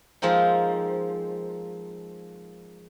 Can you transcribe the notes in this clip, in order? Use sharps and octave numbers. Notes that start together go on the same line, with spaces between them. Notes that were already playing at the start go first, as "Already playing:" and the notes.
F3 G#3 A#3 C4 D#4